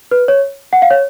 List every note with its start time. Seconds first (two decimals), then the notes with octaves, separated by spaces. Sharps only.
0.11 B4
0.28 C#5
0.73 F#5
0.82 F5
0.90 C#5